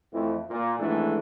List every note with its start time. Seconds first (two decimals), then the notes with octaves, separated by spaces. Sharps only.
0.12 F2 E3 A3
0.49 A#2
0.79 G#1 E3 G#3 A3 D4 A4